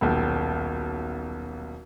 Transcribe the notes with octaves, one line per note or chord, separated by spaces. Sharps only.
D#1 B1